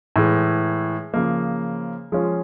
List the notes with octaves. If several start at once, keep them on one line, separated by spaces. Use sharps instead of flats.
A2 E3 G#3
C#3 F3 A#3
F3 G#3 C#4 F4